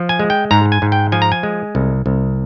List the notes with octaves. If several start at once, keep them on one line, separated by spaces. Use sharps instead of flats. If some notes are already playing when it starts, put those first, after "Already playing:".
Already playing: F3
G#5
G#3
G5
G#2 A#5
G#5
G#2
G5
F3 G#5
A#5
G#5
G#3
C2
C2